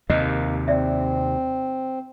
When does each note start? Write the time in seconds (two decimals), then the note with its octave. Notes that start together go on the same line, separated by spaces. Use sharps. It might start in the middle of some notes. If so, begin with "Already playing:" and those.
0.10 D#2 C3 A#3 D#5
0.68 C4 D5 E5